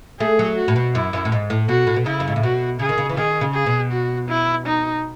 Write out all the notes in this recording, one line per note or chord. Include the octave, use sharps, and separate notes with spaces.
A3 G#4
F#3
F#4
A2
B2
F#2 E4
F#2
A2
G#2
A2
B2 F#4
A2
B2
C#3 E4
F#2
G#2
A2
B2 F#4
C#3 G#4
D#3
C#3
E3
D#3 G#4
C#3
G#4
B2
F#4
E4
D#4